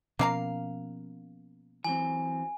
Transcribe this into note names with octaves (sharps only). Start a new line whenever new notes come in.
B2 F3 A#3 C#4 F5 A#5
E3 F#3 C4 G#5